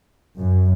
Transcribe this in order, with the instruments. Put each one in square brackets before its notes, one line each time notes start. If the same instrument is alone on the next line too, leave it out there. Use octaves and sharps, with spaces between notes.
[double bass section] F#2